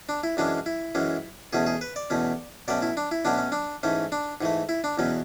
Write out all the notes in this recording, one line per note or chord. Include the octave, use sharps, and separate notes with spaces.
D4
E4
F#2 E3 G#3 C#4 D4
E4
F#2 E3 G#3 C#4
E2 B2 A3 C#4 G#4
G#4
B4
D5
E2 B2 A3 C#4
B2 F#3 A3 C#4 D5
E4
D4
E4
B2 F#3 A3 C#4 D4
C#4
D4
G#2 E3 A3 C#4
D4
G#2 E3 A3
E4
D4
E2 B2 F#3 C#4